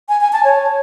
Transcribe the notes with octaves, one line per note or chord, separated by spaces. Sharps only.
G#5
G#5
A5
C#5